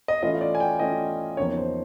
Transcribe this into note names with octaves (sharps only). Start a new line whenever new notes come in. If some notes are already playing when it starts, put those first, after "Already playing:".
D#5
E3 A3 C#4 F4 D#5
D5
G#5
G5
E3 A3 C#4 F4 D#5
E2 C#3 F3 A#3 D#4 C#5
C5